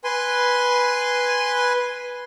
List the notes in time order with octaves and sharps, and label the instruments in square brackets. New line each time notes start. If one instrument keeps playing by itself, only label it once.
[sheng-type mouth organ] B4 G#5 C6